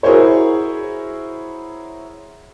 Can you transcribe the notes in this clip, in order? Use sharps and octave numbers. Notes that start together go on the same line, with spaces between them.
E4 F#4 G#4 A#4 C5 C#5